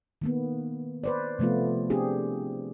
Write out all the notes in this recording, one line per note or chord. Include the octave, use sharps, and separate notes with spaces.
D#3 A#3 B3
B4 C5 D5
C3 F3 A3 B3 F4
C4 D4 G4 G#4